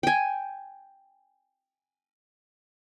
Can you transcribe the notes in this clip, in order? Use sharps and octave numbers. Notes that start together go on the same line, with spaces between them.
G5 G#5